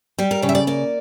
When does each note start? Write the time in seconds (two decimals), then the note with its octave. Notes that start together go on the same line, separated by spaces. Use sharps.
0.19 G3 G4
0.31 A#4
0.42 C#3 C#5
0.49 E5
0.55 D5
0.67 A#3 D5